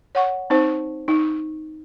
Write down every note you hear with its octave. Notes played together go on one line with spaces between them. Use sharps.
C#5 F#5 C#6
C4 D#4 C5
D#4